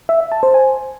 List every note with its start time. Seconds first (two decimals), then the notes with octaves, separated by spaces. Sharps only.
0.09 E5
0.20 E5
0.32 A5
0.43 C5
0.54 G#5